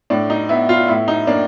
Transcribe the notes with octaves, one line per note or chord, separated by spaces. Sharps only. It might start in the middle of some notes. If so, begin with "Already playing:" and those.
A2 D4
D#4
B3 E4
F4
A2 E4
D#4
A#3 D4